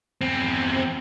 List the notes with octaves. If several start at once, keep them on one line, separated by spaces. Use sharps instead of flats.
E2 C4